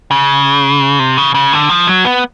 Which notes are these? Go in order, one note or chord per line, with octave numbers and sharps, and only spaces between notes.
C#3
C3
C#3
C#3
D3
F3
F#3
B3